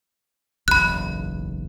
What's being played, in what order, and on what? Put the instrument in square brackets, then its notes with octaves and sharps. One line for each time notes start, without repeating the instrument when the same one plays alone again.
[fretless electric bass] F#1 B1 E2 [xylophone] B5 F#6